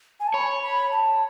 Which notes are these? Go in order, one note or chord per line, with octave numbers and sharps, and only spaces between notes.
G#5
A5
C#5 B5
B5
A5